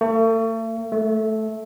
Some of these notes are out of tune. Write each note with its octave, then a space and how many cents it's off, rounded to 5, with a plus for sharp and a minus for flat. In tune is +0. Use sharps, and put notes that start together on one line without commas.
A3 +40
A3 -10